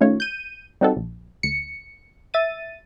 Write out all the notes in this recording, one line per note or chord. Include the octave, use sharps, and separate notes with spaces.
D#3 A3 C#4 F4 C#5
G6 D#7
G3 C4 D#4 F#4 G4 A4
A#1
D2 C#7
E5 A6 D#7